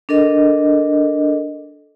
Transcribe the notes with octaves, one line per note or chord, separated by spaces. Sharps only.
D4 A4 A#4 D#5